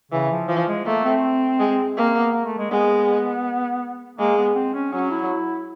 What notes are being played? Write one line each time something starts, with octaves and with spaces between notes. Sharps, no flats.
C#3 E3
F3
E3 F3
G#3
A3 A#3
C4
G#3
A#3 C4
B3
A#3
A3
G#3
G#3 B3
G#3 A#3
B3
C4
C#4
F#3 C#4
E4